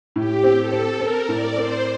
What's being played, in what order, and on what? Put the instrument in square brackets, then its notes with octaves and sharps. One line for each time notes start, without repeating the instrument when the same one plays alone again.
[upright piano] A2 [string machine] G4
[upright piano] C4
[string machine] A4
[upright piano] C4
[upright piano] C4 [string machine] A#4
[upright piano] A2 [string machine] D5
[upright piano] C4 [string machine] C5